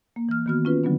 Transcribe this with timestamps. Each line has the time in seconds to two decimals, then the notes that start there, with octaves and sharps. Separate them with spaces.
0.16 A#3
0.29 E3 F6
0.46 D#3 A#3 B3 F#4 F6
0.65 C#4 F4 B4
0.84 D3 F#3 G3 B3 D4